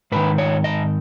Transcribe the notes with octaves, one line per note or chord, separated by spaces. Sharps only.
G#2 D#3 B4
C#5
D#5